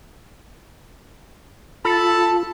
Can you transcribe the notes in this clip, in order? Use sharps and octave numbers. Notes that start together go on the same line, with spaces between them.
F4 A4 A5 B5